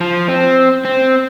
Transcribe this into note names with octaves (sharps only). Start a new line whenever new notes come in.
F3
C4
C4